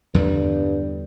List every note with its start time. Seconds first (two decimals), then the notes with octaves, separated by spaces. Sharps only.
0.14 E2 G2 D3 G3